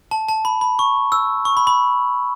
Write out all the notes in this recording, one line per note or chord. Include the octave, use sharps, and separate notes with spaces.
A5
A5
B5
B5
C#6
E6
C#6
B5
B5